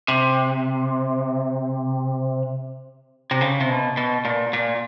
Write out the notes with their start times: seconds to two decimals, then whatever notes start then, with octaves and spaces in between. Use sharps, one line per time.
0.08 C3
3.31 C3
3.41 C#3
3.61 C3
3.69 B2
3.97 B2
4.25 A#2
4.53 A#2